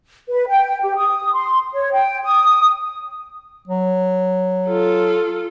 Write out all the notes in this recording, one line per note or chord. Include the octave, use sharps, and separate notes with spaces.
B4
G5
G4
D#6
C6
C#5
G5
D#6
F#3
F4 A4